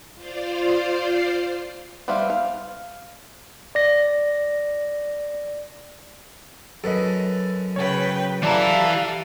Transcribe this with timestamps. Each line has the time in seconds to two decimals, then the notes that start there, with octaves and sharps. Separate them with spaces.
0.14 F4 C5 D5 F5
2.08 G3 B3 C5 E5 F5
2.30 F5
3.75 D5 A#6
6.84 F#2 A4 B4 D#5
7.76 C#3 B4 C#5 G5
8.43 E3 E4 G4 A4 D5 F5 A5 A#5